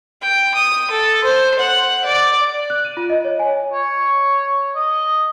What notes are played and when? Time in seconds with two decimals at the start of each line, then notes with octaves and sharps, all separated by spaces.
0.21 G5
0.55 D#6
0.91 A4
1.24 C5
1.60 F#5
2.05 D5
2.70 F#6
2.85 D#7
2.97 F4
3.10 D#5
3.25 C#5
3.39 G#5
3.73 C#5
4.76 D#5